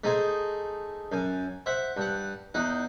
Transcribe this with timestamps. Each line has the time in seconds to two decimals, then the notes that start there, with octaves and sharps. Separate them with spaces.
0.04 A3 D#4 G#4 C5 G#5
1.12 F#2 G#5
1.66 C5 E5 F#5
1.97 G2 F#5
2.54 E2 D#4 F#5